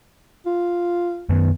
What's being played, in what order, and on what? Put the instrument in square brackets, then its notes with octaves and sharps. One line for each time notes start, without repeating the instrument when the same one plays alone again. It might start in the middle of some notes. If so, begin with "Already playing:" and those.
[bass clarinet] F4
[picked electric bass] F#2 D#3 B3